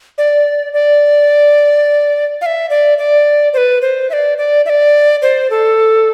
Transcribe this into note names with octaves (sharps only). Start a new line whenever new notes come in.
D5
D5
F5
E5
D5
D5
C5
B4
C5
E5
D5
D5
E5
D5
C5
A4